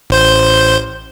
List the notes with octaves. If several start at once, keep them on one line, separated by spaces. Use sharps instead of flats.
A1 C5 G6